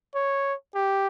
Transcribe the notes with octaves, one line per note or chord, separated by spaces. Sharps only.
C#5
G4